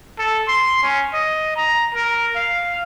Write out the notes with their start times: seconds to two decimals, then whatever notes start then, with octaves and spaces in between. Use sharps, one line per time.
0.19 A4
0.48 C6
0.82 C#4
1.14 D#5
1.56 A#5
1.95 A#4
2.36 F5